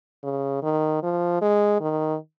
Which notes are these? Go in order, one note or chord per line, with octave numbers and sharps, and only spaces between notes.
C#3
D#3
F3
G#3
D#3